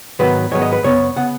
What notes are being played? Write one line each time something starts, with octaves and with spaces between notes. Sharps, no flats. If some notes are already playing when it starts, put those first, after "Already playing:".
G#2 D#3 F#3 B3 B4
G#2 D#3 F#3 B3 C#5
D#5
B4
F#2 C#3 B3 C#5
C#3 B3 F#5